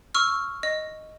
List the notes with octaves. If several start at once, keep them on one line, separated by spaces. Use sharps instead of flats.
C#6 E6 F6
D#5